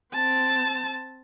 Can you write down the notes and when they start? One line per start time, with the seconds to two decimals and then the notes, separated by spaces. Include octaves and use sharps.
0.14 C4 A5